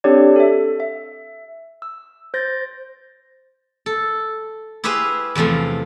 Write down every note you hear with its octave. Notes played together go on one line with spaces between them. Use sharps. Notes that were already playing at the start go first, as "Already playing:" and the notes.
C4 D4 G4 A4 C#5 D5
A4 E5
E5
E6
C5 G6 A6 A#6
A4
E4 G4 G#4 B4 C5 F5
E2 C3 F3 A3 C6